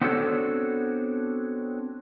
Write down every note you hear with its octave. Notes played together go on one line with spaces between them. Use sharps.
B3 C4 D4 F#4 A4 C#5